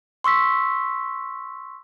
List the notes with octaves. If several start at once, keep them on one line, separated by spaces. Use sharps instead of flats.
C6 C#6 E6 B6